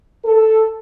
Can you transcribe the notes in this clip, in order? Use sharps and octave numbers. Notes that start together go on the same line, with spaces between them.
A4